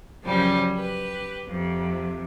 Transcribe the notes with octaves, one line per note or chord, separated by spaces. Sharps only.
F#2 C#3 F3 G3 G#5
G4 B4
F2 C3